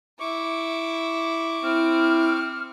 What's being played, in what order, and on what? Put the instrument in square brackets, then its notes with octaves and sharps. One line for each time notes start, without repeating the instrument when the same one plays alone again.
[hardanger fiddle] E4 [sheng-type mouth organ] C#6 D6
[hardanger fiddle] C4 [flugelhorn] E4 [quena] F6